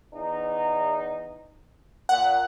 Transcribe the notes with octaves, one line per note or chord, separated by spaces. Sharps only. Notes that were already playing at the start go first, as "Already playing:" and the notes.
E2 D#4
A#2 F#5